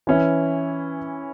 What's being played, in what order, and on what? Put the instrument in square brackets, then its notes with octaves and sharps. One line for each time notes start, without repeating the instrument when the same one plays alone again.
[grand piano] E3 C#4 E4